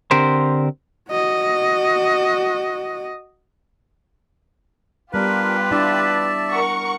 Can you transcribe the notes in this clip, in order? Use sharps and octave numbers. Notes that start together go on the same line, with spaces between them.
D3 C4 G4 A#4 C5
F#4 D#5
G3 B3 D4 F4 G4 A#4 B4
D4 E4 D5 E5 A5
A#4 F#5 C#6